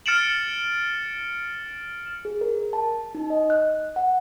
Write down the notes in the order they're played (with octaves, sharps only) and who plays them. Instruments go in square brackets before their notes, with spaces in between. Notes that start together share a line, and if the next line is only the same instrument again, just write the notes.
[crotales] F6 A6 C#7 D7 E7 F#7
[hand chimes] G#4
A#4
A5
D#4
D#5
F#6
F#5